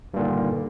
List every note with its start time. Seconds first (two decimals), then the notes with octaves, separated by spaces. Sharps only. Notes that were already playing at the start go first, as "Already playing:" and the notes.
0.14 G2
0.16 A#2
0.19 D3
0.22 D#3